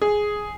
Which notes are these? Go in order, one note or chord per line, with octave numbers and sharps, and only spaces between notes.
G#4